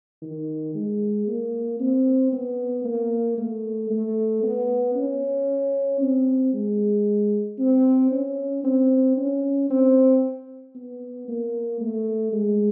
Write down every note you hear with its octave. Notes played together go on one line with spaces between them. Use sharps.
D#3
G#3
A#3
C4
B3
A#3
A3
A3
B3
C#4
C4
G#3
C4
C#4
C4
C#4
C4
B3
A#3
A3
G#3